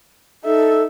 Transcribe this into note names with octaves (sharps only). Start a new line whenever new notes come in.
D#4 A4 E5